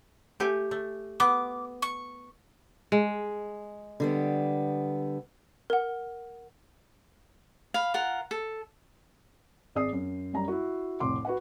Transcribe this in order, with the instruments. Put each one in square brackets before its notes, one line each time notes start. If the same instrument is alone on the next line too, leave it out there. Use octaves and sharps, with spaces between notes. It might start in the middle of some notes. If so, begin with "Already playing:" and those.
[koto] A3 G4 G#5
A3
[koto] B3 [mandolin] D6
[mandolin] C#6
[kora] G#3
[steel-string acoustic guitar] D3 G3 B3
[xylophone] A#4 F#5
[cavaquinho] F5 B5
F4 A#4 F#5
A4
[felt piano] G#1 G#4 D5 D#6 C7
F#2
F#2 G3 A#5
E4 F#4
F1 C2 A2 C6 D6
F#4 B4 F#5